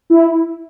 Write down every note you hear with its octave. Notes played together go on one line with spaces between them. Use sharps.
E4